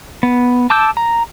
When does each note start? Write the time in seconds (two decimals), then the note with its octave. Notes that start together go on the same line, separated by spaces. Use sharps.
0.23 B3
0.70 A5 D6 E6 G6
0.97 A#5